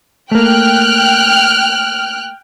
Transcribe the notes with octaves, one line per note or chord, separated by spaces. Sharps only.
A3 A#3 G5 F6 F#6